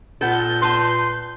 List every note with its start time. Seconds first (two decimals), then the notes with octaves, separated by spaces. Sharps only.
0.21 A#2 B3 A4 G6
0.62 B4 A5 C6